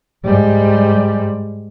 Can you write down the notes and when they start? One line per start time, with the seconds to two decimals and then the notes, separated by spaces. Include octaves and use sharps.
0.25 G#2 G3